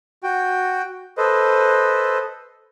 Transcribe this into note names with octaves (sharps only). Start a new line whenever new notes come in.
F#4 G5
A4 B4 C5 D#5